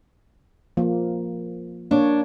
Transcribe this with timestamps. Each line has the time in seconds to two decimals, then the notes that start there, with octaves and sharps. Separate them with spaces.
0.77 F3 A#3
1.91 A#3 D4 C#5